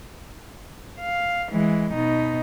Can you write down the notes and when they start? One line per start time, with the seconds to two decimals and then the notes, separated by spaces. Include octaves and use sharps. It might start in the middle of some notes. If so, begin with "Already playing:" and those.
1.01 F5
1.51 E3 G#3
1.94 B2 D#4